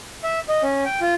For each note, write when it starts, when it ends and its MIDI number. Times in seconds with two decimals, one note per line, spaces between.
0.24 0.39 76
0.49 0.62 75
0.62 0.84 61
0.85 1.00 79
1.01 1.14 65